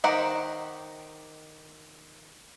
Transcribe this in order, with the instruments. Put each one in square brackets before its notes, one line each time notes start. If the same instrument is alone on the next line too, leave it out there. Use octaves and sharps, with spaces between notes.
[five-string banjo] D#3 G4 C5 F#5 A#5